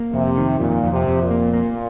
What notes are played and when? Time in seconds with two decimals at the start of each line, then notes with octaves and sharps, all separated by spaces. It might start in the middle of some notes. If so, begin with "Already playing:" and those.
Already playing: A#3
0.13 F2 C3
0.37 D#3
0.60 F2 A#2
0.83 F2
0.91 C3
1.07 F2
1.22 A#2
1.31 A#3
1.53 A#3